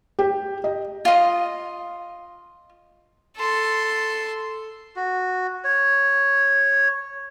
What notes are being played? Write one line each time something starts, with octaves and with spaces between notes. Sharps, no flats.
G4
D#5
F4 D#5
A4 C6
F#4
C#5